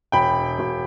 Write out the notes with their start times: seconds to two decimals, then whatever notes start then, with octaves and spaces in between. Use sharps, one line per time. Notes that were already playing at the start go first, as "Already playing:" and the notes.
0.12 E1 G5 B5
0.59 E1